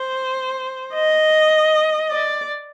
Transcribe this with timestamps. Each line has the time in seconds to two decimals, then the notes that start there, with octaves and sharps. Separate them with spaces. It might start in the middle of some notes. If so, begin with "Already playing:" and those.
Already playing: C5
0.94 D#5
2.10 D5